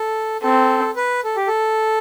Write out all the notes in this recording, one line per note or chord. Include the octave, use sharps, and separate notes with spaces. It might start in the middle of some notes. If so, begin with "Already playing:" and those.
Already playing: A4
C4 A4
B4
A4
G4
A4